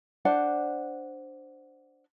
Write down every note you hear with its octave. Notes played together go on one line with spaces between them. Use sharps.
D4 C5 D5 F#5